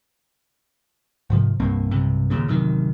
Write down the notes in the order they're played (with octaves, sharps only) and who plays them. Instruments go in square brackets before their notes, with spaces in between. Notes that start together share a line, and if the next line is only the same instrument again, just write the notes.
[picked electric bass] G#2 C3 F3
C2 G2 A#3 C4
B1 G2 C3
D#2 A#2 C#3
A1 F#2 C3 D#3